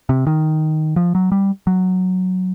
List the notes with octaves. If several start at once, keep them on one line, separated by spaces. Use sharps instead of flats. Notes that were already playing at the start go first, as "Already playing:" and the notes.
C3
D#3
F3
F#3
G3
F#3